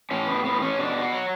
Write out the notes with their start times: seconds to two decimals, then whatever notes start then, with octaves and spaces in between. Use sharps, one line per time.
0.11 A2 C#4
0.27 B3
0.44 A2 B3
0.61 C#4
0.78 B2 D4
1.01 F#4
1.12 F#3